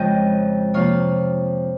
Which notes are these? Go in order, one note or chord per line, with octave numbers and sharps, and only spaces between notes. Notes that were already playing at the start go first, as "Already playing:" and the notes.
Already playing: F2 C#3 G#3 C#5 D#5 G5
C3 F3 A#3 C#5 F5